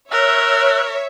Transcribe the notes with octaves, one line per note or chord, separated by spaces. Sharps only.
A#4 C#5 E5 E6 F#6